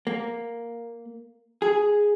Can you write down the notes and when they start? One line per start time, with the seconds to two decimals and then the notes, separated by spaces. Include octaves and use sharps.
0.07 A#3
1.62 G#4